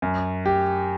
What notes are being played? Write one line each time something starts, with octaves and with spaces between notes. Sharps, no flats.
F#2
G4